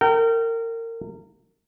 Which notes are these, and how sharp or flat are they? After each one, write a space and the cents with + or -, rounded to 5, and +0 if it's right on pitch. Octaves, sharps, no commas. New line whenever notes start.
A#4 -30 G5 -30